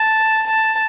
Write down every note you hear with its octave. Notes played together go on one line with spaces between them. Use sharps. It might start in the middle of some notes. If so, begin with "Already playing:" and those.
Already playing: A5
A5